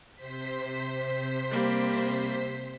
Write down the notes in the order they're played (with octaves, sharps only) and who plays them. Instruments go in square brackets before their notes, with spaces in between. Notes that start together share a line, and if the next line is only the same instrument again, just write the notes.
[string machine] C3 C5 B6
[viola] G3 A#3